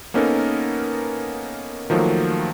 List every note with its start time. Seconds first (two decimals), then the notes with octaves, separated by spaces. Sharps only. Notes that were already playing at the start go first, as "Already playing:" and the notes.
0.14 A#3 B3 C#4 D#4 A4 A#4
1.90 D#3 F3 F#3 A3 A#3